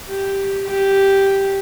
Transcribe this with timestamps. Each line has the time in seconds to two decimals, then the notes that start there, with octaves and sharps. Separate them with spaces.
0.09 G4
0.66 G4